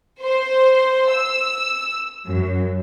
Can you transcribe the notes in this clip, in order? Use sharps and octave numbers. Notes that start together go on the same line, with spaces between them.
C5
E6
F#2